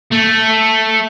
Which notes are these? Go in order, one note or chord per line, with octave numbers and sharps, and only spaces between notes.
A3